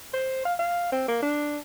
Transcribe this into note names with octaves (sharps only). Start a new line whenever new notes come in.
C5
F5
F5
C4
A#3
D4